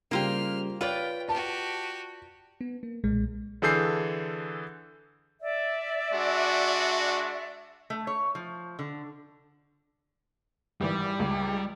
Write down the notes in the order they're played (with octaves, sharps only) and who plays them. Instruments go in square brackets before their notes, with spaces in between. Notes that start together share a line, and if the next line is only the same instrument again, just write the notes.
[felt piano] C#3 G3 [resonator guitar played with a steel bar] A#3 F4 G4 [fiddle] C5 F6
[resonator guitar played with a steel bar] F4 B4 D5 [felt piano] C#5 [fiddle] G5
[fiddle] F#4 G4 [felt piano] A5
[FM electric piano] B3
A#3
B1 A#2 G#3
[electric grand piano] D3 E3 G#4 A4 G6 C7
[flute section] D5 E5
[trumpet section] G#3 D4 F#4
[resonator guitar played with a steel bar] A3
C#5
F3
D3
[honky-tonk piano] G#1 E3 [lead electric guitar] G3
[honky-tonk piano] C#2